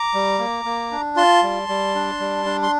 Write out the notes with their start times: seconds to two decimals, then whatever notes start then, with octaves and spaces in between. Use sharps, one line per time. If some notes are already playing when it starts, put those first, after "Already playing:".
Already playing: A#5 D6
0.14 G3
0.39 A#3
0.65 A#3
0.91 D4
1.16 F4 A5 C6
1.43 G3
1.69 G3
1.95 D4
2.20 G3
2.46 D4
2.63 C6